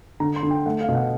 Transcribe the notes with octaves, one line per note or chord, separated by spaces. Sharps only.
D3 A#5
C6
D3
G5
A3 F#5
F5
B2
F#5